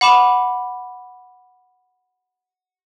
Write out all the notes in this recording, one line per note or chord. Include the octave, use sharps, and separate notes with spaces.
F#5 B5 D6 E7 F#7